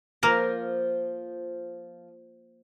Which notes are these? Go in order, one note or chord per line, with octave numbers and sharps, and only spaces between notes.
F3 A#3 A#4